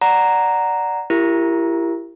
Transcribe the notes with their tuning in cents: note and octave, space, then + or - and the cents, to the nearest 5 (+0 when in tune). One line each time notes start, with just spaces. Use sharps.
D5 +0 F#5 +0 A#5 +0
E4 +30 G4 +0 A#4 +0